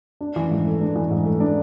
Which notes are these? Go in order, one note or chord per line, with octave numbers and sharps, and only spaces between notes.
D4
E3
G#2
A3
D4
E3
G#2
A3
D4